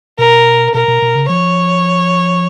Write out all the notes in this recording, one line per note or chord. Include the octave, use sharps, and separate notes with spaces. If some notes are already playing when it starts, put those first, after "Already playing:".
B2 A#4
B2 A#4
B2
B2
C#3
F3 C#5